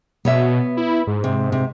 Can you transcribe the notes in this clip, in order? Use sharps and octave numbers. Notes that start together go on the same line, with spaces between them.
B2 B3 C#5 E5
E4
G#2
C3
C3